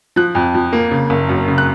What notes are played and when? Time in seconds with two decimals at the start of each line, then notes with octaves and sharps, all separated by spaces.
0.16 F3 F#6
0.35 F2
0.54 F3
0.73 A#3
0.91 C#3
1.10 F#1
1.29 F#2
1.48 C#3
1.58 F#6